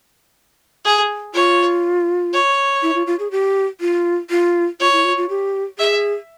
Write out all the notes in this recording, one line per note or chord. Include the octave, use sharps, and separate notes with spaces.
G#4
F4 C#5
C#5
E4
F4
F4
G#4
G4
F4
F4
F4 C#5
E4
F4
F4
G4
G#4 E5